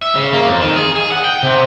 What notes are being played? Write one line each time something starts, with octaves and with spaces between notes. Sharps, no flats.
E5
C#3
A#3
F2
D#3
G#4
G#4
F#5
G5
C3